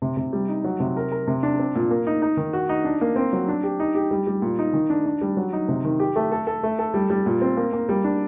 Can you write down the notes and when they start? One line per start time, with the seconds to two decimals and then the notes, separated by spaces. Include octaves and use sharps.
0.02 C3
0.17 C3
0.33 G3
0.49 D#4
0.64 F#3
0.80 C3
0.96 A#4
1.12 A#4
1.27 C3
1.43 D4
1.59 C4
1.75 A#2
1.91 A#3
2.07 D#4
2.22 D#4
2.37 D#3
2.53 F#4
2.69 D#4
2.85 D4
3.01 A#3
3.16 C4
3.33 F#3
3.48 D4
3.63 G4
3.80 D#4
3.95 G4
4.11 G3
4.27 G3
4.42 A#2
4.59 D#4
4.73 D#3
4.90 D4
5.06 D4
5.21 G3
5.37 F#3
5.53 D#4
5.68 C3
5.84 D#3
6.00 G4
6.16 A3
6.32 A4
6.47 A4
6.63 A3
6.79 A4
6.94 G3
7.10 G3
7.26 A#2
7.42 C4
7.57 A#3
7.73 A#3
7.89 G3
8.04 D4